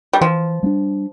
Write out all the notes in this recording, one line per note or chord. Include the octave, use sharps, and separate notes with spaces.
G3
E3 F3
G3 A#3 D4